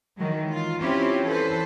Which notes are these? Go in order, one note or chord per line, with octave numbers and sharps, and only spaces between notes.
D#3 E3 F#3 G#3
F4
C4 C#4 E4 F4 G4
E3 A4 B4 C5